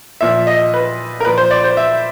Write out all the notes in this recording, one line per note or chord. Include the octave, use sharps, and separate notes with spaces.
A#2 F3 E5
D#5
B4
A#4
A#2 F3 B4
C5
D5
C5
E5